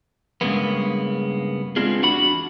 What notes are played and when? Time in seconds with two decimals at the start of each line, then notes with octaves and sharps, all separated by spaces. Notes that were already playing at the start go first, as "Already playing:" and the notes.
0.41 G2 C#3 G#3 A#3 B3
1.76 G#3 B3 C4 D4 F4 G#4
2.02 E2 D4 F#4 F#5 B5